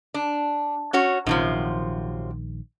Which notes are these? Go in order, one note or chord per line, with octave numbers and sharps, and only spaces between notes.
D4
C#4 F#4 C#5
A#1 F#2 C3 D#3 F3